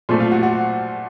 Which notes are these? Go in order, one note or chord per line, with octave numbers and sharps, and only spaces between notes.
A#2 F3 A3
F4
F#4
F#4